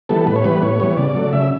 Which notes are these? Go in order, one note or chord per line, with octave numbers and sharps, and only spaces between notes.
E3 G3 B3 A4
A2 B4
C#5
E3 G3 B3 B4
A2 C#5
E3 G3 B3
C#3 D5
F#3 A3
C#3 E5